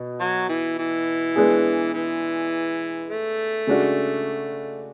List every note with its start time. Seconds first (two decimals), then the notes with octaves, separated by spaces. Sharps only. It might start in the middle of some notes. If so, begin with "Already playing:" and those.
Already playing: B2
0.20 F#3
0.49 E3
0.78 E3
1.36 G#3 B3 D4 G#4
1.93 E3
3.09 A3
3.67 C#3 G#3 D4 F#4